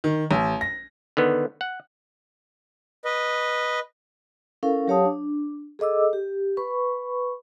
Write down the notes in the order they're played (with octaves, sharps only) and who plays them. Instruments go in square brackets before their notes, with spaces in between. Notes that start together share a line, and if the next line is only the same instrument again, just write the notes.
[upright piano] D#3
A1
A#6
[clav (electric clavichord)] D3 D#3 B3
F#5
[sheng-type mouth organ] B4 D#5
[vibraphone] C#4 E4 A4 A#4 F5
F#3 G4 C#5 F5 A5 D#6
D4
G#4 A4 D#5 D6 E6
G4
B4 B5 C#6